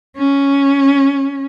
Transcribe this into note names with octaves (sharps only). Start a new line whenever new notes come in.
C#4